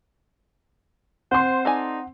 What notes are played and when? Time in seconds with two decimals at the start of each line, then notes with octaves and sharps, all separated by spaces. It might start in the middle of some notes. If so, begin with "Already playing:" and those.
1.31 C4 C5 F#5 C6
1.65 D#4 A4 D5 G#5